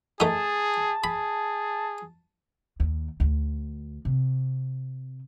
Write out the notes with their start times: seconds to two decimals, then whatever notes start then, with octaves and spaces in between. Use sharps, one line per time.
0.20 A3 D#4 G#4 A5
1.04 G#4 B5
2.80 D#2
3.20 D2
4.05 C3